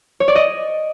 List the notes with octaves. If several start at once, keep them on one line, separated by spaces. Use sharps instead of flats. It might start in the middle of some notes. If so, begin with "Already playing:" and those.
C#5
D5
D#5